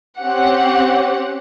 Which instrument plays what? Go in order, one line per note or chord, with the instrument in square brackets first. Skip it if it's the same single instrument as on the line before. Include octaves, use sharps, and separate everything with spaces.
[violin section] C4 C#4 G4 F#5